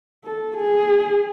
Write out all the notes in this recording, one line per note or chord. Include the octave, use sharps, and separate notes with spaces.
A4
G#4